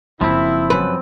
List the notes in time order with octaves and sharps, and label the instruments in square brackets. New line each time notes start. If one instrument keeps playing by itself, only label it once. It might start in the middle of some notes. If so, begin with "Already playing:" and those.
[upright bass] F#1 [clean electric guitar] F3 C4 [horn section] E4
[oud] F#2 B4